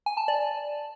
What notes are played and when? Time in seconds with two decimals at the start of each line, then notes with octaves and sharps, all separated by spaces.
0.06 G#5
0.17 A5
0.28 D5